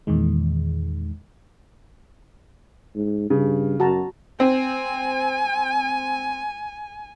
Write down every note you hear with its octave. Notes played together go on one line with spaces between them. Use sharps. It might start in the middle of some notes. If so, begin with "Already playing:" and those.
E2 A#2 D#3 G#3
G#2
G2 C#3
F#2 F#4 A5 A#5
C4 G#5